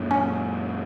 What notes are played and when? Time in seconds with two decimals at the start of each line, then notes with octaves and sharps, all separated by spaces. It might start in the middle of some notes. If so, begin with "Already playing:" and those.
Already playing: F#2 A#2 F#3
0.11 C#4